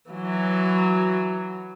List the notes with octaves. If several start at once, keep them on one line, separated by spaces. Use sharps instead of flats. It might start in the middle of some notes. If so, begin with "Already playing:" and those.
E3 F#3